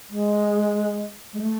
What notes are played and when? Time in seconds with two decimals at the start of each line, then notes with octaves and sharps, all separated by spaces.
0.10 G#3
1.33 G#3
1.40 A3